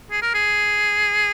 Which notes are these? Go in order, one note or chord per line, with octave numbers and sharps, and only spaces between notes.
G#4
A#4
G#4